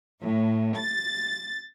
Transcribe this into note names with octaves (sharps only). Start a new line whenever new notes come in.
A2
A6